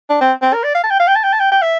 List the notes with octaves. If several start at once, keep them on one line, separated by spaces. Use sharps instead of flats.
D4
C4
C4
A#4
D5
F5
A5
G5
F5
G5
A5
G5
A5
G5
G5
E5